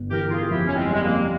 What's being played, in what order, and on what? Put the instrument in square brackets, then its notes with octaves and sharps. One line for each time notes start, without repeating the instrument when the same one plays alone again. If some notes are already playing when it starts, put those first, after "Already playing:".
Already playing: [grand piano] G1
[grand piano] E3 [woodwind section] G4 A#4
[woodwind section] F4 G#4
[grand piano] F2 [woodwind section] E4 G4
[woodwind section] C#4
G#3 C4
[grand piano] G3 [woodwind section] G#3
[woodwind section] A#3